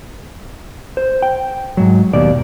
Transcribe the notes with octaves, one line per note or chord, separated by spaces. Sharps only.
C5
G5
G#2 F#3
D#2 B2 D5